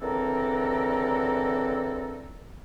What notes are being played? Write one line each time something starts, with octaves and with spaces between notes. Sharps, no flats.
C#2 D3 E3 C4 A4 A#4